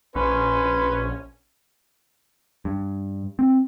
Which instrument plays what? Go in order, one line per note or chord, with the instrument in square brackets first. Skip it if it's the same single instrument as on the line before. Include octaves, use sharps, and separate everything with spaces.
[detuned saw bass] A#1 [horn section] C#4 [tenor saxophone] B4 [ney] C6
[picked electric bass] G2
C4